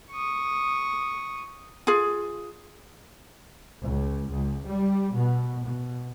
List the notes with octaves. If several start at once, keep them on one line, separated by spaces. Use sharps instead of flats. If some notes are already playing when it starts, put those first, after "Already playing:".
C#6 D#6
F4 G#4
C#2
C#2
G3
B2
B2